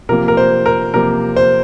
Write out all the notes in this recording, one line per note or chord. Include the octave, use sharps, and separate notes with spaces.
C3 F3 A#3 A#4
A#4
C5
A#4
C3 F3 A#3 A#4
C5